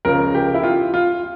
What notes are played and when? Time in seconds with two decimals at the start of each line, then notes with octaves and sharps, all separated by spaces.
0.05 C#2 C#3 F3 A#4
0.35 G4
0.54 E4
0.63 F4
0.94 F4